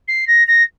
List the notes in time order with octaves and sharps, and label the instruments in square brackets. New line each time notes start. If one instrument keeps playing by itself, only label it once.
[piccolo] C7
A#6
A#6